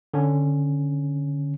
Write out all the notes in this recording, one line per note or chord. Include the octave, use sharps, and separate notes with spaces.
D3 C#4